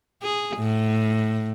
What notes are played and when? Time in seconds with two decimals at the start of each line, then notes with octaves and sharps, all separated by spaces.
0.22 G#4
0.57 A2